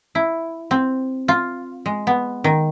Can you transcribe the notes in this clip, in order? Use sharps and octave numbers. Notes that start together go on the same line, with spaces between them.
E4
C4
F4
G#3
B3
D#3